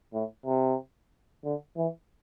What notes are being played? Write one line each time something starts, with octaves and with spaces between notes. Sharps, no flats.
A2
C3
D3
E3